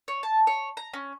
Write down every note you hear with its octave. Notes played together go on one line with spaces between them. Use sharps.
C#5
A5
C#5
A#5
C#4